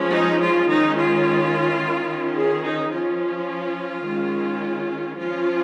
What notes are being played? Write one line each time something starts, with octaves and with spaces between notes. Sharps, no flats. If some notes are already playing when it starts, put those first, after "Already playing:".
Already playing: F3 G#3 C#4
D#4
F4
D#3 G#3 C#4 D#4
F4
D#3 C#4
G#4
D#4
F3 C#4 F4
D#3 G#3 C#4
F3 C#4 F4